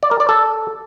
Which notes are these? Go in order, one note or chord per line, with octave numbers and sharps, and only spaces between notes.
D5
A#4
D5
A4